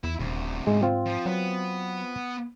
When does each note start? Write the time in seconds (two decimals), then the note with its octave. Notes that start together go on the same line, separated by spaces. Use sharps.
0.04 E2 E4
0.19 D#1 D2 C3
0.67 G#2 G#3
0.83 C4 F4
1.06 F3
1.26 F#3 B3 B4